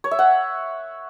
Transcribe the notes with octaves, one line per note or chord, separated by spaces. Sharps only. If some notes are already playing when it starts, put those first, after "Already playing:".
C#5
E5
F#5